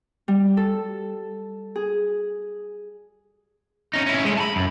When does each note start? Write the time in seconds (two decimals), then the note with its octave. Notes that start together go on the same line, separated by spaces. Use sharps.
0.28 G3
0.57 A4
1.76 G#4
3.93 C#4 D#4
4.06 C#4 E4
4.25 G#3 A3
4.37 A5 B5
4.56 F#2